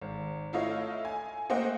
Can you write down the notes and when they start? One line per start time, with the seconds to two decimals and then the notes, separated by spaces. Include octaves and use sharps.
0.01 G#1
0.53 A3 E4 F4 C#5 D#5 F5
1.05 G#5
1.49 A3 A#3 C5 D#5 F#5 G5